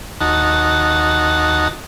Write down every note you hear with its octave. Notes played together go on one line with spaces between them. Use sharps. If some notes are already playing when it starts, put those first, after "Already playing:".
D#2 D#4 F#4 A5